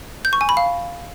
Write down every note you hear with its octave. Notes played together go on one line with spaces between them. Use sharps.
G6
C#6
G#5
B5
F5